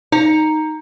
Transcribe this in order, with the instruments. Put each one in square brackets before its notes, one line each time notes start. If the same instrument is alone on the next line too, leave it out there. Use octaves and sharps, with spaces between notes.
[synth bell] D#4 [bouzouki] A#5